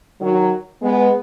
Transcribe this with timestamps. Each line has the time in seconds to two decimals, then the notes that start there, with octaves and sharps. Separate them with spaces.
0.20 D#3 F#3
0.81 G#3 B3